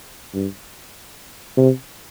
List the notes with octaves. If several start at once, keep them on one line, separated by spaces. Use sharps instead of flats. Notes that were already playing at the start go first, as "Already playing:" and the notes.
G2
C3